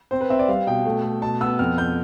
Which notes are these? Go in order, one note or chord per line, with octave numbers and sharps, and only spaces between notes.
C4 C5
B4
C4 E5
D5
G3 F5
B2 G5
A3
A3
B2 A5
B3 E6
F2 F6
F2 G6